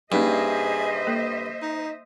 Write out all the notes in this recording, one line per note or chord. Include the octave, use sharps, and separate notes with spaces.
G2 A#3 C#4 D#4 G#4 C5 D#5 E5
A#3 A4
D#4